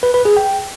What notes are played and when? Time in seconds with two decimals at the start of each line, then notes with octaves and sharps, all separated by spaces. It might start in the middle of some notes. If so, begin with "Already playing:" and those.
0.03 B4
0.14 B4
0.25 G#4
0.37 G5